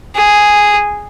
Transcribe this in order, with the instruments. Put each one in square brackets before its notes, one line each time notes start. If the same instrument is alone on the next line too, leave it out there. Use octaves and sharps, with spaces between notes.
[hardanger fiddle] G#4